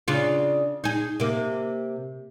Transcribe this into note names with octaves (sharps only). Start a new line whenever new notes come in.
C#3 D4 F4
D#4 G#4
C3 A#3